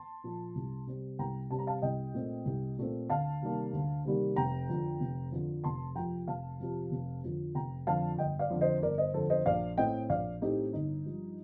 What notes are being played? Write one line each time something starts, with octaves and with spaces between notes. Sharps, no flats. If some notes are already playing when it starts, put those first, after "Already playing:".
Already playing: A5 C6
A#2 F3
C2
C3 G3 C4
C2 G5 A#5
C3 G3 C4 A5
A#5
F5 A5
C2 D#5 G5
A#2 A3 C4
C2
A#2 A3 C4
D2 F5 A5
C3 D#3 G3 A#3
D2
C3 D#3 G3 A#3
F1 G5 A#5
F2 D3 F3
F1
F2 D3 F3
F1 A5 C6
F2 C3 F3 G5 A#5
F1 F5 A5
F2 C3 F3
F1
F2 D3 F3
F1 G5 A#5
F2 D3 F3 F5 A5
G1 D#5 G5
D5 F5
F2 D3
C5 D#5
G1 A#4 D5
C5 D#5
F2 D3 A4 C5
C5 D#5
A#1 D5 F5
A2 A3 C4 D#5 G5
A#1 D5 F5
A2 A3 C4 D#4 G4
G1 D#4
G2 F3